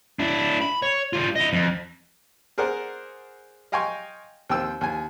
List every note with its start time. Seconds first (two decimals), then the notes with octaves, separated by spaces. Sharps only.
0.19 D4 E4
0.61 B5
0.82 C#5
1.13 G3 F4
1.36 E4 D#5
1.53 F2
2.58 G#4 A#4 C5 D5 F#5
3.72 D#5 F5 G5 G#5 C6 C#6
4.50 D#2 C4 G5 E6
4.81 D#2 G#5